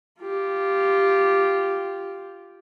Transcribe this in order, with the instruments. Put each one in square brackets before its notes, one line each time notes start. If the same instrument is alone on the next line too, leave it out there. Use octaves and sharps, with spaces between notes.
[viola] F4 G4